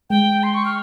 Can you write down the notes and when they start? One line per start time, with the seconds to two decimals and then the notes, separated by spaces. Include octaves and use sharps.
0.10 G#3 G5
0.43 C6
0.54 C#6
0.65 F6